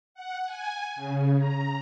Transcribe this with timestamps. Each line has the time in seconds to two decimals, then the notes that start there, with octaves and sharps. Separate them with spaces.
0.15 F#5
0.45 G#5
0.96 C#3
1.38 A#5